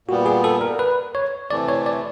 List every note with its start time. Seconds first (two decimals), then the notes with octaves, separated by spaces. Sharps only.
0.08 A#2 G3 B3 F#4
0.26 G#4
0.44 A4
0.61 A#4
0.79 B4
1.15 C#5
1.51 C3 E3 A3 D5
1.68 C#5
1.86 D5